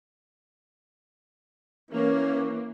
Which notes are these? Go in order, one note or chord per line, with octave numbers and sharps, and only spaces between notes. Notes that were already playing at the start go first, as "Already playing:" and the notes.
E3 A#3 C#4